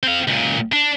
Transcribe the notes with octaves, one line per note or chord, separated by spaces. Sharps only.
C4 F5
C#2 A#2
D4